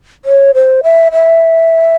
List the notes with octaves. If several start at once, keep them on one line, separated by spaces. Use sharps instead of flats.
C#5
C5
E5
E5